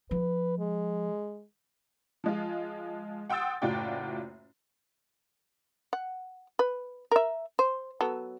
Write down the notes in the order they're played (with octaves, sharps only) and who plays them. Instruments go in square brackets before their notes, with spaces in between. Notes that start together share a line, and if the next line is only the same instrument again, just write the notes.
[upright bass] F3 [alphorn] B4
[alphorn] G#3
[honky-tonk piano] F3 G#3 F4
F#5 G5 C6 D#6 E6 A6
F#1 A2 F4 F#4 D5 G5
[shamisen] F#5
B4
A#4 E5
C5
F#3 B3 A4